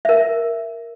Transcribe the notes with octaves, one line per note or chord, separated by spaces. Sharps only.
A#4 E5